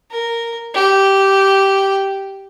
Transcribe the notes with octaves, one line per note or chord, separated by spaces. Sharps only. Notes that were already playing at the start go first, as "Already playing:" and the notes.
A#4
G4